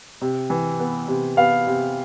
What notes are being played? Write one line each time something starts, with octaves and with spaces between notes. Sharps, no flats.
C3
E3
B3
C3
B3 F5
C3